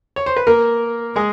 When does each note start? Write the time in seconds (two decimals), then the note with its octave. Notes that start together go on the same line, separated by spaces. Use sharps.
0.16 C#5
0.26 C5
0.37 B4
0.47 A#3 A#4
1.16 G#3 G#4